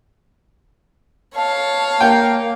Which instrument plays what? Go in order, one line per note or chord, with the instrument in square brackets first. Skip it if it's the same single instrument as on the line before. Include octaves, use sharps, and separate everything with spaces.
[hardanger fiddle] C#5 F5 [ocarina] A5
[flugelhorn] A#3 [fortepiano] G5